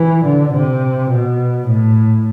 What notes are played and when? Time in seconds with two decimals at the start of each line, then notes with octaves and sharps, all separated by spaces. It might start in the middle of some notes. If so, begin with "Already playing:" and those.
Already playing: E3
0.25 D3
0.53 C3
1.11 B2
1.68 A2